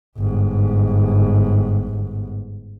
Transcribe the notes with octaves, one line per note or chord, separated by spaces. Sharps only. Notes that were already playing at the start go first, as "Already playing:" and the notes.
G1 G#2